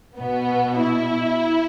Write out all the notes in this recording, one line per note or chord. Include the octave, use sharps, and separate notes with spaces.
B2 B3
E4